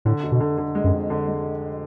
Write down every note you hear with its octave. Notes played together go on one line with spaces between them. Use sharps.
A2 D3
F1
B2
D3
D3
G#3
F#2
F2
D3
G#3